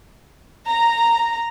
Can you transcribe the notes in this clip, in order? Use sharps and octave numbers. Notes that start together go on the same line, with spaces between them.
A#5